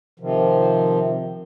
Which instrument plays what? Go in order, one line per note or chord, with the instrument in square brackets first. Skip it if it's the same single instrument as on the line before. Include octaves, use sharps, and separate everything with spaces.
[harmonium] C3 D#3 F3